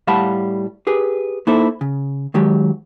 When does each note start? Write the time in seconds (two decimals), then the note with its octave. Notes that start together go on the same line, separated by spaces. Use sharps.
0.07 A2 G3 F5 F#5 A5 B5
0.87 G4 G#4 B4
1.47 A#3 D#4 E4 A4 C5
1.81 C#3
2.34 D#3 F#3 G#3 G4